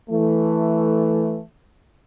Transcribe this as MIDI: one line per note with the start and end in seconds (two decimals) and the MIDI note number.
0.11 1.41 52
0.11 1.41 57